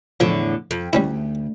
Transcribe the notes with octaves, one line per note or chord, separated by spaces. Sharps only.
E2 A2 D3 F3
F2
D2 G3 C#4 E4